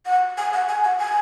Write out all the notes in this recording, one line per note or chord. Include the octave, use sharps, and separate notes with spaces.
F#5
G#5
F#5
G#5
F#5
G#5